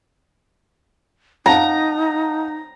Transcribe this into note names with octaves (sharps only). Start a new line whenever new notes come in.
D#4 F5 F#5 A5 A#5